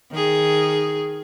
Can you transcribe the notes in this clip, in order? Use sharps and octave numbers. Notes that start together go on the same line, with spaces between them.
D#3 G#4